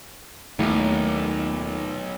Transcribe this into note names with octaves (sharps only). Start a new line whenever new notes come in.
D#1 B1 A#2 D#3 A3 E4